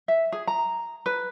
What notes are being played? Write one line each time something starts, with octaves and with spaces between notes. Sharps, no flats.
E5
G#4
A#5
B4